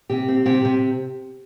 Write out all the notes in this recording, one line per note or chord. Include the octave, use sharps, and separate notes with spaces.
C3 G4
C4
C3 G4
C3